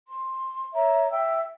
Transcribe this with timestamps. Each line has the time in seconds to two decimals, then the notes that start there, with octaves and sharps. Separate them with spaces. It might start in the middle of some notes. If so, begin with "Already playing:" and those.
0.08 C6
0.74 C#5 E5 A#5
1.11 E5 G5 E6